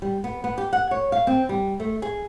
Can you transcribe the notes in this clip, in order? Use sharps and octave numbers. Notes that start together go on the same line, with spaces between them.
G3
B3
B3
G4
F#5
C#5
F5
C4
G3
A3
G#4